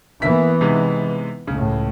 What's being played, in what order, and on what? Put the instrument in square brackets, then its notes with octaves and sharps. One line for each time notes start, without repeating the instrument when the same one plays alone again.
[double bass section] E3 B3 [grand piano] A#3 E5 B6
[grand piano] C3 G#3 D#4
[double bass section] C#2 A2 [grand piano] C#3